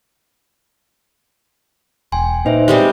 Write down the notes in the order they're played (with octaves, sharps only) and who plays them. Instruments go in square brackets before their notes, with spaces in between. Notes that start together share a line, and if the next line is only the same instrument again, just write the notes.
[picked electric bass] E1 [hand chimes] G5 G#5 C6
[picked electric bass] A#2 [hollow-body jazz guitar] D#4 [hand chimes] B4 C5 E5
[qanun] G3 G#3 C4